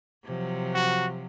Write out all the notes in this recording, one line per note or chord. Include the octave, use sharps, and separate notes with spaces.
C3 F3 F#3
F#4